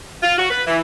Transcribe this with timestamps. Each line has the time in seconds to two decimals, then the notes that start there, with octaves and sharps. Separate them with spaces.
0.23 F4
0.38 F#4
0.51 B4
0.67 E3